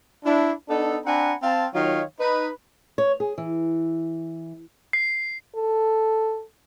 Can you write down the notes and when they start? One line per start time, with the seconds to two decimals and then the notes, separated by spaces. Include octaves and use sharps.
0.25 D4 E4
0.69 B3 D4 D#4 A4
1.05 C4 D4 F#5 G#5 A#5 B5
1.43 C4 F5 A5
1.74 D#3 F#3 D#4 F4 C#5 F5
2.20 D#4 B4
2.98 C#5
3.20 G#4
3.38 E3
4.93 C7
5.55 A4